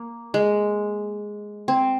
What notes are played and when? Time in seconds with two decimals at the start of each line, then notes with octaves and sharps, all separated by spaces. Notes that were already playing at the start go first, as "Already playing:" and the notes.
Already playing: A#3
0.34 G#3
1.68 C4